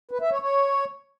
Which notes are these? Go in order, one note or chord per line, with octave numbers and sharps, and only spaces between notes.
B4
E5
C#5
C#5